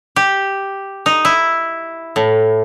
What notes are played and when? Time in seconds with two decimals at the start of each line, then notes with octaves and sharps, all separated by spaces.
0.16 G4
1.06 D#4
1.25 E4
2.16 A2